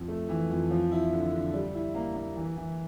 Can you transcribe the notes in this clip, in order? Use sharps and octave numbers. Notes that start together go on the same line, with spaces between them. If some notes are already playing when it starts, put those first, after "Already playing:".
Already playing: F2
A3
E3
F2
F3
E4
D3
D3
G3
E4
A#3
A#3
E3
E3